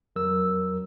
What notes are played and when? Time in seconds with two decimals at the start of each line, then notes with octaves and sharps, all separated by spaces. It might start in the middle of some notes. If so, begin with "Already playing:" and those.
0.16 F2 F#3 A#4 E6